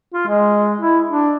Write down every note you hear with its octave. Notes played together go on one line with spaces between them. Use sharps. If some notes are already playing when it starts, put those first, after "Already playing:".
F4
G#3
E4
D4